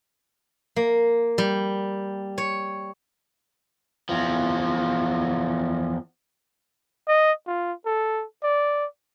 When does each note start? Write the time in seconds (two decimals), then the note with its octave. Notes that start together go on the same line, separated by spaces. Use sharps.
0.76 A#3
1.38 G3
2.38 C#5
4.09 E2 F3
7.08 D#5
7.47 F4
7.86 A4
8.43 D5